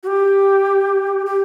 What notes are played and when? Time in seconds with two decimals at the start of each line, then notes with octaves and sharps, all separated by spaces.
0.03 F#4
0.07 G4
1.26 G4